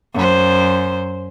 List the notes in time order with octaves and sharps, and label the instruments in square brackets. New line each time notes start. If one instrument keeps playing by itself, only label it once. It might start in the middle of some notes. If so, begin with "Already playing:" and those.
[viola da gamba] F#2 C5